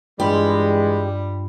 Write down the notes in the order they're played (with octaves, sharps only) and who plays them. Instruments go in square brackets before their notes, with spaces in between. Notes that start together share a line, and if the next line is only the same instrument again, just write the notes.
[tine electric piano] G2 F4 B5 [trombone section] E3 G#3 [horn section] G3 [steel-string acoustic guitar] G4